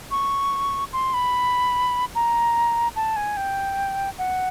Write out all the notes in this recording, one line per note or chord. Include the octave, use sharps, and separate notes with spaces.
C#6
C6
B5
A#5
A5
G#5
G5
F#5